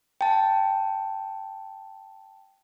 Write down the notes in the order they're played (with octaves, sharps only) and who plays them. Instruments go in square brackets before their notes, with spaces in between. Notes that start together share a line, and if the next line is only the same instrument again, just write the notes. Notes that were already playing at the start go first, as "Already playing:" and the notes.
[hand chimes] G5 A5